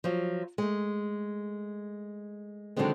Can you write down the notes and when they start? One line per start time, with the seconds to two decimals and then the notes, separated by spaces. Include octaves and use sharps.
0.04 F3 F#3
0.58 G#3 A3
2.76 D3 D#3 F3 F#3 G#3 C4